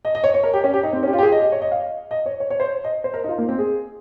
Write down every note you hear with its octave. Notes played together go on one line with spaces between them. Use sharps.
D#5
D#5
C#5
C#5
A#4
G4
C#4
G4
D#4
C4
C#4
G4
F4
G4
G#4
D#5
D#5
C#5
D#5
F5
D#5
C#5
C#5
C#5
C5
D#5
C5
A#4
D#4
F4
A#3
C4
G#4